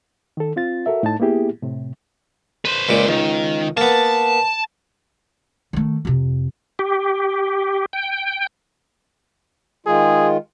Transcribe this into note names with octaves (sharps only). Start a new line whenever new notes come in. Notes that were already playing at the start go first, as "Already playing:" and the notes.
D#3 A4
C4 F4 A6
F#4 A4 A#4 E5
A2 D#4 A5
A#3 B3 E4 G4 G#4
A2 C3
B4 C5
C#2 A#2 D6
C#2 D#3
A#3 B3 A5
D#3 A3
F2 C3
G4
G5
D#3 G#3 F4 G#4